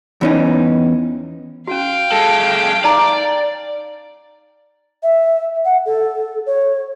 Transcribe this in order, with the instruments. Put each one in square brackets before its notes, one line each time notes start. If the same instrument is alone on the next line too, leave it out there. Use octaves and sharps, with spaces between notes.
[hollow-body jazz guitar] E2 C#4 D#4
[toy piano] C#4 F#4 [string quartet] F5 G5
[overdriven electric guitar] G#3 A4
[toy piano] D#4 A5 A#5 [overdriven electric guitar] D5
[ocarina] E5
F#5
A4
C#5